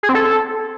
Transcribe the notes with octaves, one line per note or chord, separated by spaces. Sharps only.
G#4
C4
A4